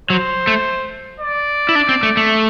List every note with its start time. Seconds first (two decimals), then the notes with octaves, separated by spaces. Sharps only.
0.10 F#3 C5
0.47 A3
1.20 D5
1.69 E4
1.75 D4
1.89 C4
2.03 A3
2.17 A3